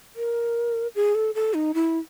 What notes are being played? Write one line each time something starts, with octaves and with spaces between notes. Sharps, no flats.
A#4
G#4
A4
A4
D#4
E4